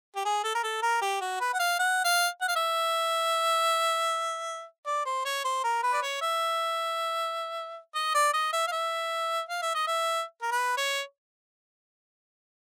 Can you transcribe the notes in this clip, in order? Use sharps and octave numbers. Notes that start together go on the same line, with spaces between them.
G4
G#4
A4
A#4
A4
A#4
G4
F#4
B4
F#5
F5
F#5
F5
F#5
F5
E5
D5
C5
C#5
C5
A#4
B4
D5
C#5
E5
D#5
D5
D#5
E5
F5
E5
F5
E5
D#5
E5
A#4
B4
C#5